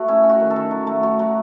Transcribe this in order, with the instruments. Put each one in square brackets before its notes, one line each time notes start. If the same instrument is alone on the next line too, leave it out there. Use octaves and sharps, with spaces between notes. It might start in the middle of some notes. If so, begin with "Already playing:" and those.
Already playing: [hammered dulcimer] A3 F#4
C#4 E4
C#4
F#4
D#3
A4
D#3
F#3
A3
F#3
F#3